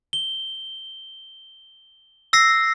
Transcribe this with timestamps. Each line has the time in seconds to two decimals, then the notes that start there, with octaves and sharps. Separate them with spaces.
0.13 G7
2.33 E6 A#6 C7